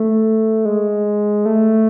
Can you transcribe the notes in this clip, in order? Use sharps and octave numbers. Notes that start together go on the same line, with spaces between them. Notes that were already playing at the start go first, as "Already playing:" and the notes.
Already playing: A3
G#3
A3